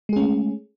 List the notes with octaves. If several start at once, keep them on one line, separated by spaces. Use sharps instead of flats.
G#3 A3 C#4 G#4